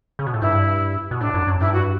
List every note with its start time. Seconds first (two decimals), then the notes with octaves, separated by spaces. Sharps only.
0.19 C#3
0.26 B2
0.34 A2
0.42 G2 E4
1.11 B2
1.21 A2 D4
1.34 F#2
1.47 F#2
1.61 G2 E4
1.73 F#4